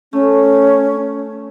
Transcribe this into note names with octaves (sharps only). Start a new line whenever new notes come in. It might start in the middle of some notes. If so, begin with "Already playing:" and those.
A3 C#4